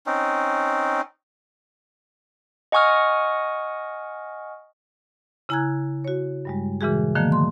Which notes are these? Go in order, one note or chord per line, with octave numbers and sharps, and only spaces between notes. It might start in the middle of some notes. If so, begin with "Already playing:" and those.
C4 C#4 D#4
D#5 F#5 G#5 C#6 D#6 F6
C#3 E4 G#5 A#5 F#6 G#6
F#4 C#5
G2 G3 G#3
A#2 C#3 E3 G#3 F#4 G#4
D3 D#3 F3 A3 A#3
C6